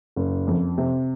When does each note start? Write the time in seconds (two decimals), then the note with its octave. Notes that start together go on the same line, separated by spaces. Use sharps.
0.16 F#1
0.47 F2
0.78 C3